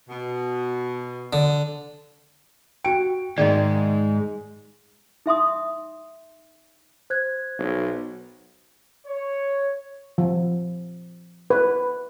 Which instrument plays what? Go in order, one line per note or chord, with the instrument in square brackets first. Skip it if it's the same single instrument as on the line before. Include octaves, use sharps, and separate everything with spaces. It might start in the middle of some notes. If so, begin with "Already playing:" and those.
[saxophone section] B2
[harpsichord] D3
[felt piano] F#4 D7 [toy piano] G5
[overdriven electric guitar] G#2 G#3 [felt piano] D#3 [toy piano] D5 D#5
[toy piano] D#4 E5 C6 D#6
[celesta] C5 F#6 G#6
[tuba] B1
[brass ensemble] C#5
[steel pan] F3
B4